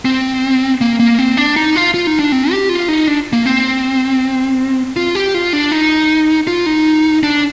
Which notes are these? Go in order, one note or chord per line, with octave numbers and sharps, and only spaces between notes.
C4
A#3
A#3
C4
D4
D#4
F4
F4
D#4
D4
C4
G4
F4
D#4
D4
A#3
C4
F4
G4
F4
D4
D#4
F4
D#4
D4